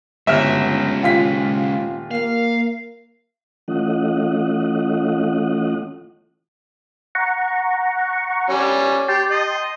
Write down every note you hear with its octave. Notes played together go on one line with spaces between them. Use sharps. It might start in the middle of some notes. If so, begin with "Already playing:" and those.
G1 C#2 F#4 E5 F6
D#1 F4 B6
A#3 F5
E3 A3 C#4 F4 D#5 F#5
F#5 A#5 C#6
G3 C#4
G4 G5 A5 C6
D#5